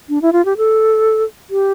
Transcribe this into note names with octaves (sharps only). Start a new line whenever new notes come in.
D4
E4
F4
G4
A4
G4